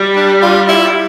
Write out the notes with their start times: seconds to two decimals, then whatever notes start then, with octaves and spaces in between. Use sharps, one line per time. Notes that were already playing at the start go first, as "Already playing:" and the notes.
Already playing: G3
0.16 D4
0.42 F4
0.69 E4